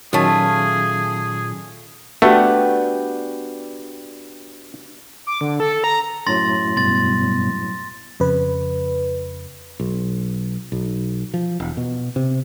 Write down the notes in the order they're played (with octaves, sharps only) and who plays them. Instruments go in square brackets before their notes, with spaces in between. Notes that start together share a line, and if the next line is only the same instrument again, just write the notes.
[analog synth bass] A#2 [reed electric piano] D#3 F#3 C#4 [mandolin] A3 F4 [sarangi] G#4
[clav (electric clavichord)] A3 [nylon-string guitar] B3 [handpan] D4 F#4 G4
[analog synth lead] D6
D3
A4
A#5
[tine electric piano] F#2 A2 F#3 [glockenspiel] C6 A6 A#6
[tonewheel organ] G2 B2 [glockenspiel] C6 A6
[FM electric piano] F2 C#3 B4
[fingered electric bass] B1
B1
F3
E1
B2
C3